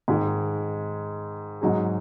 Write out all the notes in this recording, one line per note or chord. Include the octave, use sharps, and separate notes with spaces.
G#2 D#3 G#3
G#2 F#3 D#4 G#4